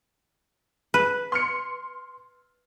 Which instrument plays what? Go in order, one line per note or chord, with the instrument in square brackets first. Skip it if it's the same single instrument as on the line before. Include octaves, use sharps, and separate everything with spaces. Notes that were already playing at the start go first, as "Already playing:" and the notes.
[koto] B4
[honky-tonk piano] C6 F6 C#7